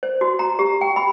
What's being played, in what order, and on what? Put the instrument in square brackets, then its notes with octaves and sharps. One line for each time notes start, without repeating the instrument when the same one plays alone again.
[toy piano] C5
F#4
A#5
G4
G5
B5